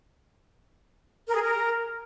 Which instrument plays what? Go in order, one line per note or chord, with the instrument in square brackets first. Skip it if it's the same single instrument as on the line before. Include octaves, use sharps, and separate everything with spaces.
[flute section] A#4
G#4
A#4